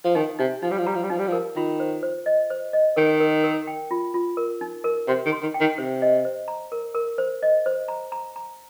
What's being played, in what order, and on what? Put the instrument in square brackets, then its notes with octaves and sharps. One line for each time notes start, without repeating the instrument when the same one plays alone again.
[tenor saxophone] F3
[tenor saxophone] D#3 [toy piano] D#4
[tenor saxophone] C3 [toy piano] D#4
[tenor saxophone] F3 [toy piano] D#4
[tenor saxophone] G3
F3
[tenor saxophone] G3 [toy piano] A#5
[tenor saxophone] F3
G3
[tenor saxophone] F3 [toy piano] D#4
[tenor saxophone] G3
F3
[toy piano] A#4
[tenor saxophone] D#3 [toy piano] F4
[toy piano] C5
C5
D#5
C5
D#5
[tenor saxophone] D#3 [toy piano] A#4
[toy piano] A#4
A#4
G5
F4
F4
A#4
D#4
A#4
[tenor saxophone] C3 [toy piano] C6
[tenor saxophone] D#3
[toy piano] C6
[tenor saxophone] D#3
[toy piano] G5
[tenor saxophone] D#3
[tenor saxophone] C3 [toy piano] C5
[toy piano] D#5
C5
A#5
A#4
A#4
C5
D#5
C5
A#5
A#5
A#5